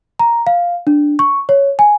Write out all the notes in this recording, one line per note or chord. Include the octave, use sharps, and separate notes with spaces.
A#5
F5
D4
C#6
C#5
G#5